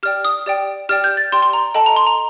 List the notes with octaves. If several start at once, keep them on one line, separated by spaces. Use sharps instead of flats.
G4 D5 G5 F6
D#6
G4 D5 G5
G4 D5 G5 F6
G6
A6
G4 D5 G5 C6
C6
A#5
A4 D#5 G5 A5
A#5
C6
A#5